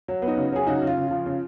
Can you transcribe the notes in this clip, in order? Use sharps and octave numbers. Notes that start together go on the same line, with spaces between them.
F#3
B3
D#4 F#4
C#3
F#3 G#4
C#3 D#4 F#4
C#3
F4
C#3
F3 F4
C#3